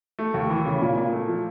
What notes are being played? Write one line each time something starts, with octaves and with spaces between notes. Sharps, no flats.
A3
D#2
E3
C#3
A#2
A#2
A3
F3